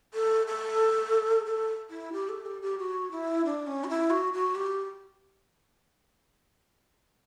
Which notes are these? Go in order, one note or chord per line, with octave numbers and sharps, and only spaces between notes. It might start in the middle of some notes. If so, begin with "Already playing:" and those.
A4
A4
A4
E4
G4
A4
G4
G4
F#4
E4
D4
C#4
F#4
E4
F#4
F#4
G4